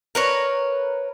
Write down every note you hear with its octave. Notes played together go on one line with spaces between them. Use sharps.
A#4 B4 C#5